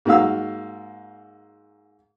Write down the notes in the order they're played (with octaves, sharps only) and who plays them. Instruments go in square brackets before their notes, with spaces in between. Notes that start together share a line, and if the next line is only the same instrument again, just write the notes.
[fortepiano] G#2 A#3 F#4 F5 E6